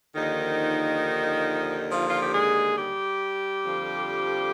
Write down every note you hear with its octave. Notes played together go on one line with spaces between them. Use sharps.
D#2 D3 D#3 F3 D#4
F3 F4
F4
G4
G#3 G#4
G3 G4
F2 D3 F3